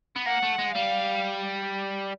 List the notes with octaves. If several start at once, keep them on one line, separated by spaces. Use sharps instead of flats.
B3
A#3 F#5
A3
G#3
G3 F5